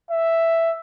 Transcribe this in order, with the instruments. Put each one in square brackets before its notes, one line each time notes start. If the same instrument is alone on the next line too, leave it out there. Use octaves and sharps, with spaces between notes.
[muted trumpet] E5